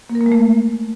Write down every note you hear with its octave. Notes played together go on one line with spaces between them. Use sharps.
A#3
A#4
A#3
G#3
A3